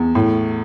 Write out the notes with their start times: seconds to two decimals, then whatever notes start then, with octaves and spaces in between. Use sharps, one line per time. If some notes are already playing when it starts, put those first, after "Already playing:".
Already playing: E2
0.15 A2